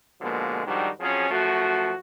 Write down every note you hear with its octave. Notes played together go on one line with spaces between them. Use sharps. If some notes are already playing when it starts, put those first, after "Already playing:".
B2 D3 F3 G#3 A#3
G#2 D#3 F3 G3 D4 F#4
F2 F3 F#3 C#4 G#4
F#2 F3 A3 F#4